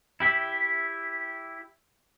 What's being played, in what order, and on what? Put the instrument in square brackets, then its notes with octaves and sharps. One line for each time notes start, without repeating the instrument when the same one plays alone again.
[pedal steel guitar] E4 G4 E5